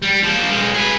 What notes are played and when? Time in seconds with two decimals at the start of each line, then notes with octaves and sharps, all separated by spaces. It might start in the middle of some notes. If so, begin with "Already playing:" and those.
0.02 G3
0.23 F3 A#3
0.50 B1 G#3
0.74 G#4 B4